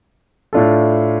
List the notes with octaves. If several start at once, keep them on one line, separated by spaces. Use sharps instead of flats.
A2 A3 D4 F4 A4